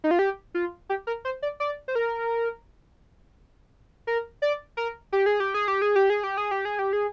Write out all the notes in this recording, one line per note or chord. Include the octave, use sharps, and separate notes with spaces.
D#4
F4
G4
F4
G4
A#4
C5
D5
D5
C5
A#4
A#4
D5
A#4
G4
G#4
G4
G#4
G4
G#4
G4
G#4
G4
G#4
G4
G#4
G4
G#4